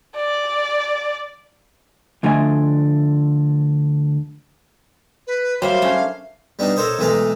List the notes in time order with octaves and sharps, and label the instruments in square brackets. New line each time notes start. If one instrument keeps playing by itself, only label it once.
[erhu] D5
[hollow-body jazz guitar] D2 D3 F3 A3 D#5 G#5
[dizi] B4
[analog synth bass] F#3 [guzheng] G3 A#3 E5 [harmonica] C5 [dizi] F5
[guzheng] A3 C#4 D4
[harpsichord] G3 B3 D4 D#4
A4 A#4 C5 C#5 D#5
B1 E3 G#3 A3 D#5 A#5